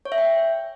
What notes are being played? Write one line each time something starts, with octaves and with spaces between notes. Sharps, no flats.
C#5
E5
G5